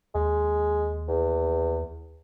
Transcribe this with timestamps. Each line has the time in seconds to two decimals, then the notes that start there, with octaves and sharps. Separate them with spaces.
0.15 D#2 G#3
1.08 E2